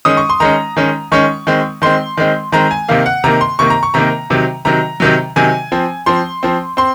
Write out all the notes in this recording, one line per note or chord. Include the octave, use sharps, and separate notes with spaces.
D#3 G#3 C#4 D#6
C#6
C6
D#3 G#3 C#4 A#5
D#3 G#3 C#4
D#3 G#3 C#4 C#6
D#3 G#3 C4
D#3 G#3 C4 C6
D#3 G#3 C4
D#3 G#3 C4 A#5
G#5
C3 D#3 A#3 F5
F#5
C3 D#3 A#3 A#5
C6
C3 D#3 A#3 C#6
A#5
C#6
C3 D#3 A#3 A#5
C3 D#3 F#3
C3 D#3 F#3 A#5
C3 D#3 F#3
C3 D#3 F#3 G#5
F3 C4
F3 C4 C6
F3 C4
C4 C6